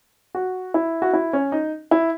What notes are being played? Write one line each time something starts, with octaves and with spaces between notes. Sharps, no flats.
F#4
E4
F#4
E4
C#4
D#4
E4